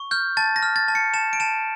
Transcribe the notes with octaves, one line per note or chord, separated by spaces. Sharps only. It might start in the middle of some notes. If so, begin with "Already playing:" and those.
Already playing: C#6
F6 G6
A5 A6
A#6
F6
A6
A5
C#7
A5 E7
D7
A5 E7